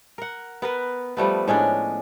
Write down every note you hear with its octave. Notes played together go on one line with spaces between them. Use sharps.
A#4 F#5
B3 A#4 B4
F3 G3 A3 B3
A2 G#3 C#4 D4